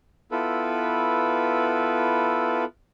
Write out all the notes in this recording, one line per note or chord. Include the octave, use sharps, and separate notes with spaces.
B3 E4 F4 A4 B4